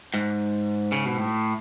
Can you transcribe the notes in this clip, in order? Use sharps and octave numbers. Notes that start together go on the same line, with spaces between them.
G#2
C#3
B2
A2